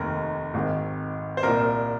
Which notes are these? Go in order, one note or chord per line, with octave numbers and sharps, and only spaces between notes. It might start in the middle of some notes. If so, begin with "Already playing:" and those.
Already playing: F1 D#2 D#3 A#4
G#1 G#2 D#3
C5
C2 A#2 A#4